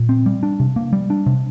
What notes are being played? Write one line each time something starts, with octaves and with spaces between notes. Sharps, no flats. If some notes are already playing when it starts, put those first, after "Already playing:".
Already playing: A#2
C4
G3
D4
C3
A#3
G3
D4
C3